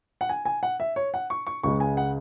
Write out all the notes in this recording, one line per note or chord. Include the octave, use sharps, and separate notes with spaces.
F#5
G#5
G#5
F#5
E5
C#5
F#5
C#6
C#6
C#2 C#3 G#3 C#6
G#5
F#5